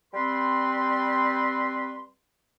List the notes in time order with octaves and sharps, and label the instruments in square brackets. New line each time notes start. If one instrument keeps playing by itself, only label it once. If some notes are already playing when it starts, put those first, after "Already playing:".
[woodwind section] G3 C4 B4 C6